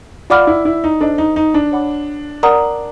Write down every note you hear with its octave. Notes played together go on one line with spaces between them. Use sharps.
F4 D5 F#5 B5 D6 F6
E4
E4
D#4
D4 A4 C5 D#5
D#4
D#4
D4
C#5 F#5 B5 D6
A#4 D5 F#5 A#5 D#6